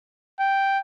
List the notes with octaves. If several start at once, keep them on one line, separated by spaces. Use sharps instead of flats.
G5